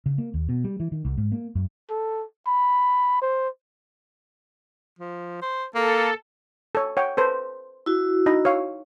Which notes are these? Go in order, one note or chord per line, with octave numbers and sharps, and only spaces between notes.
C#3
A#3
D#2
B2
G3
E3
D#3
C2
G#2
A#3
F#2
A4
B5
C5
F3
C5
A#3 A4
A4 C#5
C#5 F#5 G5
A4 B4 C5
E4 F#4
D#4 D#5 B5
C#5 F5